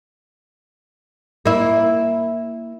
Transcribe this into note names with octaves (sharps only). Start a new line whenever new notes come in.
A#3 E4